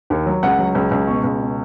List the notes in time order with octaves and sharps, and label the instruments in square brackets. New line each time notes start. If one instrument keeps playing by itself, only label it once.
[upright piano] D#2
F#3
C#2 F#5
F#3
C#2
C#2
B2 C#6
C#2
B2